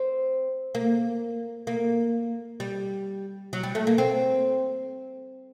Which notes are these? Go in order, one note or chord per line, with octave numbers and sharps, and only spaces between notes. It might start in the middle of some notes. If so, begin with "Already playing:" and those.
Already playing: C4
A#3
A#3
G3
F#3
G3
A3
A#3
C4